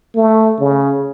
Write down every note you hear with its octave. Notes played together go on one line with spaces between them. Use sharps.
A3
C#3